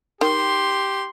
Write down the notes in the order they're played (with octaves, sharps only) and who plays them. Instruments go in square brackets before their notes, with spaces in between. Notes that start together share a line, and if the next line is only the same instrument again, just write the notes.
[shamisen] D#3 [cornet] G4 [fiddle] C6